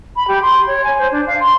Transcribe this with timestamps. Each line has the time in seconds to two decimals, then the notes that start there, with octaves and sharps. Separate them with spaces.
0.16 B5
0.27 G4
0.42 C6
0.67 C#5
0.83 G#5
0.98 C5
1.11 D4
1.26 F5
1.39 C6